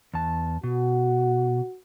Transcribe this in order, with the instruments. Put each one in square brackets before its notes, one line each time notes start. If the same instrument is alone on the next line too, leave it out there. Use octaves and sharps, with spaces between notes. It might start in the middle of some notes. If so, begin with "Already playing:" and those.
[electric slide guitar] E2 A5
[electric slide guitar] B2 [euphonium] F#4